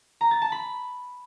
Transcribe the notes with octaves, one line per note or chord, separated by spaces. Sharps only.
A#5
A6
A5
B5